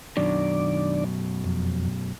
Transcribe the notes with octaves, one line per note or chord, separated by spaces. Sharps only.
F#2 B2 D#3 F#3 D4 D5
F2